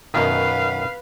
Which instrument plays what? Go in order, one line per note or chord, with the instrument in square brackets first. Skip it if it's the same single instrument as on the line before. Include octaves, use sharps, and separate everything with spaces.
[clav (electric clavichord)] F#2 B2 D#3 [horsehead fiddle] B4 F5